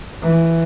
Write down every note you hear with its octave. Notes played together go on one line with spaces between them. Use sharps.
E3